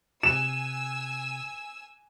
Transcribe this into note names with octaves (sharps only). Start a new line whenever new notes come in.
C3 G#5 E6 E7